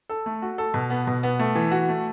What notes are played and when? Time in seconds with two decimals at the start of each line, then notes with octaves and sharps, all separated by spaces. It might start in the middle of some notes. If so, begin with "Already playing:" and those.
0.09 A4
0.26 A3
0.42 F#4
0.58 A4
0.74 B2
0.90 B3
1.07 B2
1.23 B3
1.39 A3
1.55 E3
1.71 F#4
1.89 A3